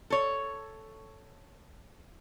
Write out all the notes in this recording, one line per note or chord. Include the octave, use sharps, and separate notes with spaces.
A4 C#5